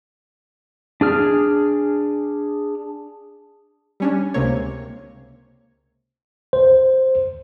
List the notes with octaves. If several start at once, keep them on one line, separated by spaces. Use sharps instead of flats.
D4 G#4 F6
G3 C#4 D4
C#2 C3 A#3 C#5
C5